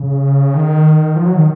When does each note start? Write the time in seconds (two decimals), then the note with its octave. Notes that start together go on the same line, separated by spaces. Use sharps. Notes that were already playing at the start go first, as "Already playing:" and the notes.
Already playing: C#3
0.54 D#3
1.16 F3
1.25 F#3
1.36 D#3